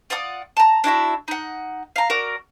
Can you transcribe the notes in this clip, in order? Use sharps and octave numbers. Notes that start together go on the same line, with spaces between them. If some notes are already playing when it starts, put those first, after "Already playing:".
F4 D5 F#5 D#6
A5 A#5
D4 E4 F#4 E5
D#4 F#5
F5 A#5
F#4 A#4 D5